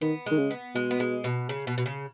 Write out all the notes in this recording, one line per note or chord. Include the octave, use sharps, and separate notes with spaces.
D#3 B3
D#3 G#3
C#3
B3
B2 G#3
B3
G#3
B2
C#3
B2
B2
C#3